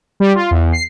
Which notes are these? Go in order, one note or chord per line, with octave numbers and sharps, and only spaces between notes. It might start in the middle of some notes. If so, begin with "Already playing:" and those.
G3
F4
E2
C7